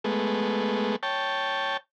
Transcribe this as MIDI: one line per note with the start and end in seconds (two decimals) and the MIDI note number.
0.04 0.96 56
0.04 0.96 57
0.04 0.96 59
1.03 1.77 73
1.03 1.77 79
1.03 1.77 81